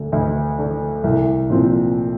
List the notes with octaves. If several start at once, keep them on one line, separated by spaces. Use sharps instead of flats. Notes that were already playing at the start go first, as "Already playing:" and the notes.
Already playing: D2 D3 A3
D2
D3 A3
C2
A#2 F3 C4 F4